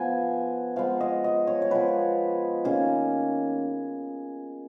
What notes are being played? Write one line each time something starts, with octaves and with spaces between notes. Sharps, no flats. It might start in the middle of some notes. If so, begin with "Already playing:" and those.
Already playing: F3 B3 G#5
F3 G#3 B3 F5
D#5
D#5
C#5
C#5
F3 G#3 B3 B4
D#3 A#3 C#4 G#4